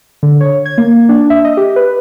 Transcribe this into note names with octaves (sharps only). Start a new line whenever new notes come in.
D3
C#5
G#6
A#3
D4
E5
D#5
G4
B4